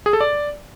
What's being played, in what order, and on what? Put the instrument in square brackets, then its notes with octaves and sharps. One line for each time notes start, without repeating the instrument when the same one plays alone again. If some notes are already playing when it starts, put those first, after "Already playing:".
[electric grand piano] G#4
A4
D5